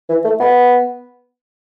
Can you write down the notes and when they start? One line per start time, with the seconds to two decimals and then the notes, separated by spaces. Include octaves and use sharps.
0.09 E3
0.24 A3
0.40 B3